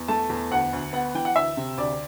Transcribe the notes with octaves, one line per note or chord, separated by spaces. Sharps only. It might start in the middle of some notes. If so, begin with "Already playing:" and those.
Already playing: E2
A3 A5
E2
D2 F#5
D2
B3 F#5
E3 G5
F#5
D2 E5
C3
D2 D5